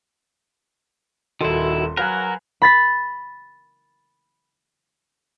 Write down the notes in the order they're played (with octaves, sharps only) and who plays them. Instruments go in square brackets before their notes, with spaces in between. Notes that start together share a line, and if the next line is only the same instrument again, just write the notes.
[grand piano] D#1 A4 [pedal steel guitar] D#3 E4 [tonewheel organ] F#4 [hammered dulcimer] C6
[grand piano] F#3 [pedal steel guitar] F#4 A#4 [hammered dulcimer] B4 F5 G#5 [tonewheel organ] F#5
[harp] B5 A6 B6